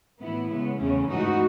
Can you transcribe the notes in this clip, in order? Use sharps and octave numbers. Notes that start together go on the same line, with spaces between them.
A2 E3 B3 E4
C#3 G#3 B3
E2 C#3 E3 A3 C#4
G#2 E3 A3 D#4 F#4